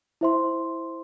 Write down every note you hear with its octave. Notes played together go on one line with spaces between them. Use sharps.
E4 C5 E5 C6